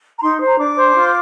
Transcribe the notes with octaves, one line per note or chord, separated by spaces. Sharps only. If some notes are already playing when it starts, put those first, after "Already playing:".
A#5
D#4 C6
C5
A#5
D4 D6
C5
F4